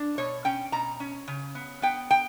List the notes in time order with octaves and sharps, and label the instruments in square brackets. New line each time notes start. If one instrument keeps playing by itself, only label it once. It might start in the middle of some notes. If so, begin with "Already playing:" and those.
Already playing: [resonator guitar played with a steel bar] D4
B2 C#5
C#4 G5
B2 A#5
C#4
C#3
B3
B3 G5
G5